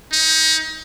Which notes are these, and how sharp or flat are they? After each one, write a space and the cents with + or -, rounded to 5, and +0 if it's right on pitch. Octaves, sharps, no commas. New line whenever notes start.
D#4 +30